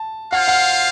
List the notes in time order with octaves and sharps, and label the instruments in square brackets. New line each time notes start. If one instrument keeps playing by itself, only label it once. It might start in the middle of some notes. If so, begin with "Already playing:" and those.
Already playing: [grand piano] A5
[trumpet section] F4 C5 F5 [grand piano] F#5
[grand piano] F#5